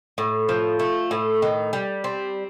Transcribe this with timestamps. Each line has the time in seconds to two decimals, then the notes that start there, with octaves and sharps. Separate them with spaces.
0.18 A2
0.49 F3
0.80 A3
1.11 A2
1.42 D#3
1.73 G3
2.04 C4